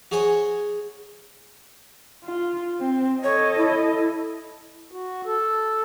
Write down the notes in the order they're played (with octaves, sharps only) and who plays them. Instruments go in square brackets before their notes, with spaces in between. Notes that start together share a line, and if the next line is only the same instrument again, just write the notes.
[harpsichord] F#4 G#4 C5 C#5 G#5
[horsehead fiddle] F4
C4
[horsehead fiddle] A4 D#5 [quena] C#5
[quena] E4
[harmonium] F#4
A4